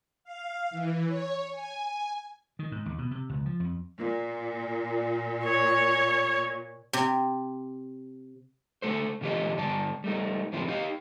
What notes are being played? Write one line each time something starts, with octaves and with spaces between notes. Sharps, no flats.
F5
E3
C#5
G#5
D#3
G#2
D#2
B2
C3
C#2
F3
F2
A#2
C#5
C3
D3 A3 A4 C5
A#2 D3 E3 F4 G4 D#5
G2 D3 D4 A5
G3 A3 D#4
F2 A2 D3 F3 C4 E4
D#4 G4 D#5 F5